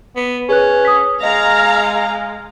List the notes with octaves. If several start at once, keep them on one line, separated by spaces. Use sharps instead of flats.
B3
C#4 G#4 B4 F#6
D#6 B6
G#3 D#5 F5 A#5